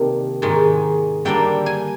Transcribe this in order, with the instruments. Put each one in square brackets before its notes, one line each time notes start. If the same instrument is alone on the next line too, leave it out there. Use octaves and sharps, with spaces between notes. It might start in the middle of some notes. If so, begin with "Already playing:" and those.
Already playing: [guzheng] C3 D#3 A#3 D4
G#2 D#3 G#3
D3 G3 A#3 D4 G5
G#5